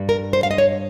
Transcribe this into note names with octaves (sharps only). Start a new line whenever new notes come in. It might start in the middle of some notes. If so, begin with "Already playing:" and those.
Already playing: G2 G3
A#4
C5
F5
D#5
C#5